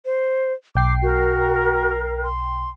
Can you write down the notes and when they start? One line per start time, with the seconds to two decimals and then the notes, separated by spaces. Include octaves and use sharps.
0.05 C5
0.75 B1 G5 D6 C7
1.02 F#4 A#4
2.24 C6